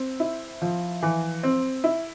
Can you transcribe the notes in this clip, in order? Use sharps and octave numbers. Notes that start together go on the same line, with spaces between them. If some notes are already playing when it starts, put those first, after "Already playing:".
Already playing: C4
E4
F3
E3
C4
E4